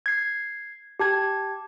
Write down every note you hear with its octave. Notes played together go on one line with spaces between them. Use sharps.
G#6 C7
G4 A5 G#6